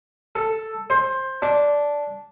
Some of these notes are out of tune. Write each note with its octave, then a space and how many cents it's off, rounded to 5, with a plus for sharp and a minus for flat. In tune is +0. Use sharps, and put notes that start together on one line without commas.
A4 +5
C5 +15
D4 -10